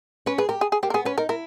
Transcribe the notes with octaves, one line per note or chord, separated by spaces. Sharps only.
C#4 B4
G#4 B4
G4 A#4
G#4
G#4
A#3 G4
A#4
B3 G#4
C#4 B4
D#4 A#4
E4 A#4